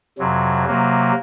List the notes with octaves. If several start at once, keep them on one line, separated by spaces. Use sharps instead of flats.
F2 C3 F#3
C3 F#3 A#3